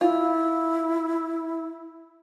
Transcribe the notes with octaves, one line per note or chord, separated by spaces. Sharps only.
E4 F4